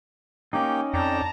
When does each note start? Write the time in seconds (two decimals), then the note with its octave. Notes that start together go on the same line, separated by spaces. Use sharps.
0.53 A#3 C#4 D#4 G4 G5
0.94 F2 D5 G5 A5 A#5